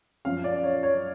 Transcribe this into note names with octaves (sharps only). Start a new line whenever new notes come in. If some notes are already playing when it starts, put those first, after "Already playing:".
F#2 F3 F5
D5
C#5
C#5